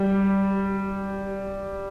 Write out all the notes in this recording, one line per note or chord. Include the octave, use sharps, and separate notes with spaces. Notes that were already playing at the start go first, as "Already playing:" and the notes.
Already playing: G3